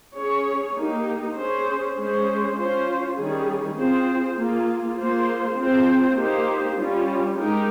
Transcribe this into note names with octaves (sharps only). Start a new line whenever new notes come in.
C#4 G#4 C#5
A#3 D#4 G4
C#4 G#4 C5
G#3 C#4 G#4 C5
C#4 F4 C5
D#3 G3 C#4 G#4
C4 F4 G#4 C5
A#3 F4 G#4
A#3 F4 G#4 C5
C4 F4 G#4 C5
A#3 D#4 G4 C5
G3 C#4 F4
G#3 D#4 G4 A#4